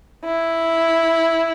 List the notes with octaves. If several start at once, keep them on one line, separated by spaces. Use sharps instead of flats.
E4